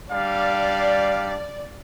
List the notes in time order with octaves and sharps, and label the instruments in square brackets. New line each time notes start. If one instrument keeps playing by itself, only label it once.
[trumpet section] G3 D4 F5 [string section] D5